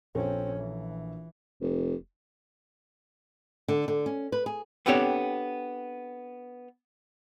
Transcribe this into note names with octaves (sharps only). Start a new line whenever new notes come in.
A#1 C4 C#4 A4
E3
F1
D3
D3
C#4
B4
G#4
B3 C4 D4 G4 A4 C#5